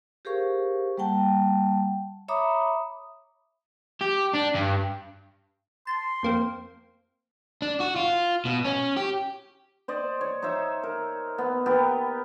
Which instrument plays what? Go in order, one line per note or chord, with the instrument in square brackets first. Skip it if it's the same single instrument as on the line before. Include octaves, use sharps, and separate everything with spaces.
[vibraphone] G4 G#4 A#4 C5 F5 C#6
G3 A#3 F#5 G5 A5
C#5 E5 A#5 B5 D6 D#6
[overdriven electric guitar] G4
D4
G2
[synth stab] A5 [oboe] C6
[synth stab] F2 A#3 C4
[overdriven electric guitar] D4
F#4
F4
B2
C#4
G4
[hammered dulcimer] C5 D5 D#5
C#5
D#4 C5 C#5 E5
A#4
B3
B3 G4 A#4